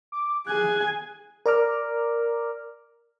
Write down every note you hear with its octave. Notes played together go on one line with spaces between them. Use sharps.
D6
G#4 G#5 F#6
A#4 D5 A#5 D6 F6